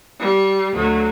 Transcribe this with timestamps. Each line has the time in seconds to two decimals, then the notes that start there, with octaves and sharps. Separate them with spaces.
0.18 G3
0.72 D2 F#3